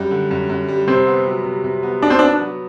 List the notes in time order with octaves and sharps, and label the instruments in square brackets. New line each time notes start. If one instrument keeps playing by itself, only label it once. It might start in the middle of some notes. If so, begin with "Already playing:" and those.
Already playing: [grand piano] F#2 G3
D3
F#2
F#2
G3
[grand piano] C3 [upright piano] C4
[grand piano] B3
F#3
C3
C3
B3
[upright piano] D4 [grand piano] F#4
[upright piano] C4
[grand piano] B3 [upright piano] D4
[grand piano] F#3